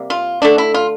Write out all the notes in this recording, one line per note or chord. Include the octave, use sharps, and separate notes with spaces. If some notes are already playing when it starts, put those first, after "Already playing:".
Already playing: C3 G3 A#3
F4
D3 A3 D4
E4
F4